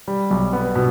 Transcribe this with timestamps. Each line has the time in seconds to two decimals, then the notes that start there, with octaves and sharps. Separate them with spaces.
0.08 G3
0.30 B1
0.53 B3
0.76 B2